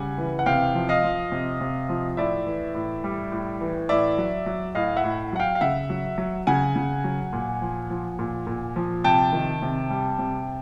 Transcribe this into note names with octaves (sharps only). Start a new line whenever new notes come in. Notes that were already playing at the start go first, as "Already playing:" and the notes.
Already playing: C#3 G3 F#5 G#5
E3
F#5
C3 F5 G5
F3
D#5 F5
F3
C3
C3
F3
A2 D5 E5
E3
A2
G3
A2
E3
A2 D5 E5
F#3
F#3
A2 D#5 F5
E5 F#5
A2
F#3 F#5
F5 G5
F5
C#3 E5 F#5
F#3
F#3
C#3 F#5 G#5
C#3
F#3
A#2
F3
F3
A#2
A#2
F3
C3 G5 A5
D#3
C3
G3
C3